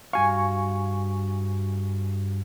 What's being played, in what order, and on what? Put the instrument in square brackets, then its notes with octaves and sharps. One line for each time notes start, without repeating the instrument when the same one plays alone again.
[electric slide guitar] G2 F#4 F5 [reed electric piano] G#5 C#6